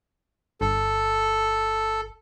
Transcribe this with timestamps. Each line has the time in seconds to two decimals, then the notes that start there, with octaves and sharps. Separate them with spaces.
0.61 G1 A4